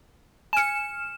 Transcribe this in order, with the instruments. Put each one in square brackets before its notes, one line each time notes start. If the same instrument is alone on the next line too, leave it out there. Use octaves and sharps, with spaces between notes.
[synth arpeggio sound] G#5 C#7 [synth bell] F6 E7